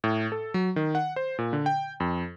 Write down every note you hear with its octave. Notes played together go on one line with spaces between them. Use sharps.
A2
A4
F#3
D#3
F#5
C5
A#2
D3
G5
F2